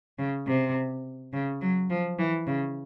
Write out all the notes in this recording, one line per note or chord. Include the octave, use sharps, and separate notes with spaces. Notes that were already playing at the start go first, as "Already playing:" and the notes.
C#3
C3
C#3
F#3
F3
E3
C#3